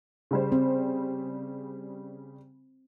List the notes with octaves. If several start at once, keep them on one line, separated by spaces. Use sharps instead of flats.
C#3 G3 C5
C4